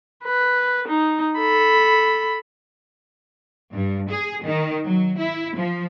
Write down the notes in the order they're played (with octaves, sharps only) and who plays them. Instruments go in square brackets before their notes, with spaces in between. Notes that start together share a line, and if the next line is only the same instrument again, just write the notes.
[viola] B4
D#4
A4 B5
[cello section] G2
G#4
D#3
F#3
E4
F3